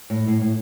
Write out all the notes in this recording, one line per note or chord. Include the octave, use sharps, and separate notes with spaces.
A2
A2
A2